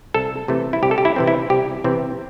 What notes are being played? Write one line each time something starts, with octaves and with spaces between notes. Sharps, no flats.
C2 A4
C3 E3 A3
E4
C2 G4
A4
G4
E4
C3 E3 C4
E4
C2 G4
C3 E3 C4